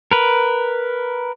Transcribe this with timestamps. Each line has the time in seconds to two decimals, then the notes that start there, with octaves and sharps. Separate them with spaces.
0.11 A#4 B4